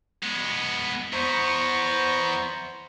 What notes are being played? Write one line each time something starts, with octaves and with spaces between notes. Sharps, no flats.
G#3 B3
E2 B3 C5 A#5 C#6